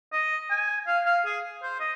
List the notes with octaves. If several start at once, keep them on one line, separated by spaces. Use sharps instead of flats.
D#5
G#5
F5
F5
G#4
C5
D#5